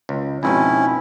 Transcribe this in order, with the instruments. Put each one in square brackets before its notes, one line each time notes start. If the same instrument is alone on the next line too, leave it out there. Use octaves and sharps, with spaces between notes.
[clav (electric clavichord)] C#2
[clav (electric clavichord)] F2 G#2 B2 [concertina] C#4 E4